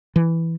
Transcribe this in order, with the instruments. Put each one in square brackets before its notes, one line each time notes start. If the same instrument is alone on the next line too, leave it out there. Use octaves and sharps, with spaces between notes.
[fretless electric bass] E3